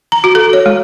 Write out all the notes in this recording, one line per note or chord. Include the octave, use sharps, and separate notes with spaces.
A#5
F#4
A4
C#5
G#3